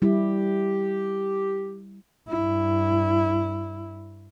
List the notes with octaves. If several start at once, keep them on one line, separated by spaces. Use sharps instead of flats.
G3 E4 G4
G2 E4